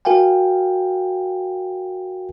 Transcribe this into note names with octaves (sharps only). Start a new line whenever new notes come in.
F#4 A#4 F5 G5 G#5